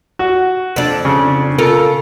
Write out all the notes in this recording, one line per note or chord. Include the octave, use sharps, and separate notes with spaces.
F#4
F2 D4
C#3
F4 A4 A#4